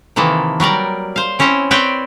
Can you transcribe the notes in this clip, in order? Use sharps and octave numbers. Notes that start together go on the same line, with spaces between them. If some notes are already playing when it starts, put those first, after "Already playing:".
C3 D#3 E3 A#3 A4
F#3 G3 A#4 D5
C5 F5
C4 C#4 E4 C5 C#5
C4 B4 C#5 D5 G5